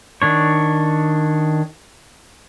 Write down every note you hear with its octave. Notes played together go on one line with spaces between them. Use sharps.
D#3 D4 C#5